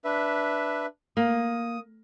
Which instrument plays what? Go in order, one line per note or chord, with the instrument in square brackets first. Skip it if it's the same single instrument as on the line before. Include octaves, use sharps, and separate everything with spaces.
[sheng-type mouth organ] D4 B4 E5
[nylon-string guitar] A#3 [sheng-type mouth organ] D#6